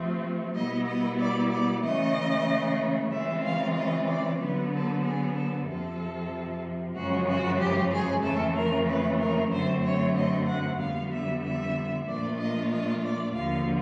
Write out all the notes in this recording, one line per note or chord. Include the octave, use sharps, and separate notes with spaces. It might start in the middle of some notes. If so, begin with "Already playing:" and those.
Already playing: C3 F3 A3 C4
B2 G3 B3 E4 D#5
D#5
D5
D5
C#3 E3 A3 D#5
C#3 E3 G#3 C4 F4 E5
F5
D#5
D5
D3 F#3 B3 B4
A4
G#4
A4
F2 C3 F3 A4
F#2 C#3 F3 G#3 C#4 F#4
F#4
G4
G#4
F2 C#3 E3 A3 A4
A#4
B4
A#4
F#2 D3 F#3 A3 C4 C5
C#5
D#5
F#5
F2 D3 G3 B3 F5
E5
E5
A#2 F3 A3 D4 F4 D5
D#5
D#5
D5
D#2 D3 F3 F5